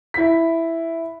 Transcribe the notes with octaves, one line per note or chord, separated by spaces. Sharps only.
E4 B6